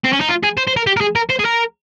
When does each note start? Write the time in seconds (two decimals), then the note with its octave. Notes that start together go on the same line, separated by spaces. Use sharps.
0.04 C4
0.13 C#4
0.20 D#4
0.29 F4
0.43 G#4
0.57 C5
0.67 C5
0.77 A#4
0.87 G4
0.97 A#4
1.01 G#4
1.16 A#4
1.30 C5
1.39 G#4
1.45 A#4